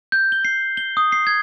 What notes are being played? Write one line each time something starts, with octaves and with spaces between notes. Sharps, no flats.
G6
G7
C7
G7
D#6
C7
G#6